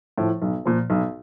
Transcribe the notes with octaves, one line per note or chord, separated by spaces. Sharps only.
A2 F3
B1
A#2 F3
B1